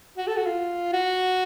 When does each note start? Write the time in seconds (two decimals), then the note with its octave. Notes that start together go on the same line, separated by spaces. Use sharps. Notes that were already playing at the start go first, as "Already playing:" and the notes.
0.18 F#4
0.27 A4
0.37 F#4
0.46 F4
0.93 F#4